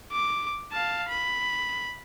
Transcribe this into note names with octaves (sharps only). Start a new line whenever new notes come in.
D6
F5 A5
B5